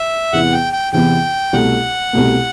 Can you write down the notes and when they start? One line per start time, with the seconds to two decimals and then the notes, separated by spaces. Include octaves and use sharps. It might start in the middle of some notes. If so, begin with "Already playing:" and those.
Already playing: E5
0.33 E2 C3 E3 B3 E4 F#5
0.53 G5
0.73 G5
0.92 E2 C3 E3 B3 E4 G5
1.53 C2 B2 A3 F#5
2.13 C2 B2 A3